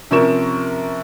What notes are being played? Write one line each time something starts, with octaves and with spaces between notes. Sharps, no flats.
C3 F3 C#4 A#4 C#6 E7